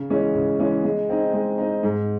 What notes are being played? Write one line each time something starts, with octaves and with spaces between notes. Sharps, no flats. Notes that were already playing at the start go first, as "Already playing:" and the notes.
Already playing: C#3
E3 G#3 C#4
C#3
E3 G#3 C#4
G#3
C4 D#4
G#3
C4 D#4
G#2